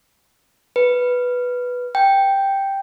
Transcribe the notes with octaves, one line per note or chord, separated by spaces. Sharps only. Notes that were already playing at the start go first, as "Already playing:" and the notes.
B4
G5